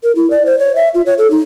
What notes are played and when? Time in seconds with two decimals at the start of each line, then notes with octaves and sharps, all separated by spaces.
0.03 A#4
0.16 E4
0.31 D5
0.46 C5
0.59 C#5
0.75 E5
0.94 F4
1.06 C#5
1.18 A4
1.31 D#4